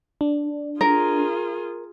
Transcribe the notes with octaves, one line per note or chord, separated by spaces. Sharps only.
D4
F4 G#4 A#4